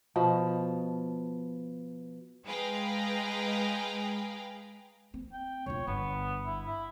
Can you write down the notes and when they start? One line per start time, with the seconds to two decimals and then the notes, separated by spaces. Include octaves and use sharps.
0.16 B2 F3
2.44 G#3 G#4 B4 F5 G5 A#5
5.14 C4
5.33 G5
5.66 E1 F4 C#5
5.87 G1 B3
6.46 E4
6.66 E4